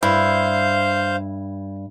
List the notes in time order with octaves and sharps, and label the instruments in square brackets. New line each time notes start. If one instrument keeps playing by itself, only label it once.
[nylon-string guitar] G2 [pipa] E4 [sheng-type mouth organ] C5 F5 G6